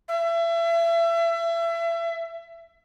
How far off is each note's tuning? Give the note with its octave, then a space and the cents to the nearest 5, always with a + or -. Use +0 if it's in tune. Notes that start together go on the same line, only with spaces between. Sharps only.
E5 +30